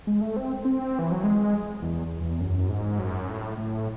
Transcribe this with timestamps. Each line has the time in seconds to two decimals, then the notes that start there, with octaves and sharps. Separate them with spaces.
0.07 G#3
0.21 A3
0.36 C4
0.65 C4
0.99 E3
1.12 F#3
1.23 G#3
1.82 E2
2.21 E2
2.40 F#2
2.69 G#2
2.99 F#2
3.28 A2
3.57 A2